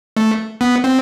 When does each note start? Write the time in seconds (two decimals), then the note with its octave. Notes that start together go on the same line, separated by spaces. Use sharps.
0.17 A3
0.61 B3
0.84 C4